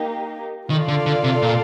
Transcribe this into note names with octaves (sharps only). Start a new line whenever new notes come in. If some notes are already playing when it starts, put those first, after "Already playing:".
Already playing: A#3 D#4 G4
D#3 F4 A4 D5 F5
D3
D3
C3
A#2